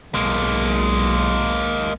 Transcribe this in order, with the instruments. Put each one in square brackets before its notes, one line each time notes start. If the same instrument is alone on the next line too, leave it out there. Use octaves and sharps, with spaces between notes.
[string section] B1 [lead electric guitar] G#3 A#3